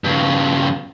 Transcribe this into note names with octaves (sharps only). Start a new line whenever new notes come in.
G2 C#3